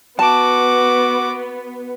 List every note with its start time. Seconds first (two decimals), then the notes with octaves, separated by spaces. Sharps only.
0.19 B3 F#4 A5 D6